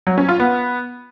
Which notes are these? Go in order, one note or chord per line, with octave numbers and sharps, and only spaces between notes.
F#3
C#4
F4
B3